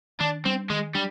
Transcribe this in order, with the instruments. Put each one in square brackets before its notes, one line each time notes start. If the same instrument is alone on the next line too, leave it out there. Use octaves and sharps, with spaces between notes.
[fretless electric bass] D#3 [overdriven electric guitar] D4
[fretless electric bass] G3 D4 [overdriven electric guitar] C4
[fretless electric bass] D#3 [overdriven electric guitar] G#3
[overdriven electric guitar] G3 [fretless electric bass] D4